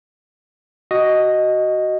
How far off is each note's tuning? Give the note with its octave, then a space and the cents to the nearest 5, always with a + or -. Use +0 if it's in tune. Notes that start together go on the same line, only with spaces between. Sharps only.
F#4 +15 D#5 +0